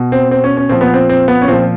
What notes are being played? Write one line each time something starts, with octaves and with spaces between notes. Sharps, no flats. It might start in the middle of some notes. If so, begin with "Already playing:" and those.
Already playing: B2
C4
C4
C#4
C#4
A#2 F3 C4
B3
C4
C4
B3
C#4
A#2 F3 C4